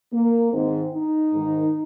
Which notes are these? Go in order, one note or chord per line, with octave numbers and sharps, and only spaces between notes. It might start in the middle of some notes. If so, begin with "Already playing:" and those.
A#3
G#2 D#3 C4
D#4
G#2 D#3